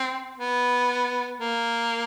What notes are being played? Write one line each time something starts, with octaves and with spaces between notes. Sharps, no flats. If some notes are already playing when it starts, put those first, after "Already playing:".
Already playing: C4
B3
A#3